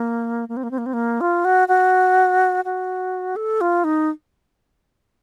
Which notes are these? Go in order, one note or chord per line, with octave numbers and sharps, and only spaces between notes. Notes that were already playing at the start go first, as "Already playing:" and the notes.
Already playing: A#3
A#3
C4
A#3
C4
A#3
C4
A#3
F4
F#4
F#4
F#4
A4
F4
D#4